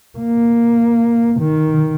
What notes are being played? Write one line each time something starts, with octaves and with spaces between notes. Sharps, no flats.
A#3
D#3